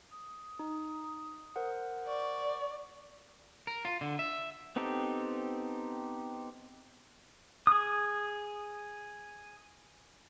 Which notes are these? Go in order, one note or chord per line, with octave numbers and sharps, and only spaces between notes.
D#6
D#4
A#4 C5 F#5
D5 C#6
A#4
F4
D3
E5
B3 C4 D#4 G4 A4
G#4 D#6